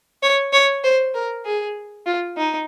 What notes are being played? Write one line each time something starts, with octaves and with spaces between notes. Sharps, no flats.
C#5
C#5
C5
A#4
G#4
F4
D#4